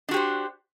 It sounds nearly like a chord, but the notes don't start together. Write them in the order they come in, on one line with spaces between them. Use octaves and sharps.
D4 F#4 G4 C5